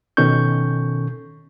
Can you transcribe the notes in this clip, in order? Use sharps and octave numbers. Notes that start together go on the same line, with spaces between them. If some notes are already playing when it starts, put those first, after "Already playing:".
B2 D#3 C#4 A4 C#6 G6